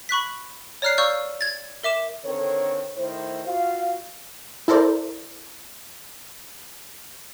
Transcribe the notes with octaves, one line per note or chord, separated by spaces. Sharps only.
B5 C#6 F#6 B6
C#5 D5 A#5 F6 F#6 C7
D5 F5 C#6 E6 F6 G6
G#6 A6
A#4 E5 D6 E7
D3 D#3 C4 A4 A#4 C#5
D#3 A3 E4 C5
F4 F#4 F5
E4 A4 A#4 C5 D5